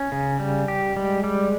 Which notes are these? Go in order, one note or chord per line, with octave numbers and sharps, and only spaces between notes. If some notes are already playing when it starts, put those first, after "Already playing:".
Already playing: C#4
C#3
G3
G4
G3 G#3
G3